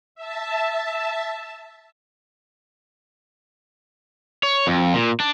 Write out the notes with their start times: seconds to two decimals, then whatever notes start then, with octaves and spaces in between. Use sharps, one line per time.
0.15 E5 A5
4.43 C#5
4.67 F2
4.94 A#2
5.20 D4